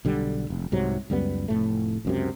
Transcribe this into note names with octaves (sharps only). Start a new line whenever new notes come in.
B1 D3 G3
F1
C2 G#2 C3 F#3
C#2 F#2 G3 B3
F1 A2 A3
C#2 F#2 C3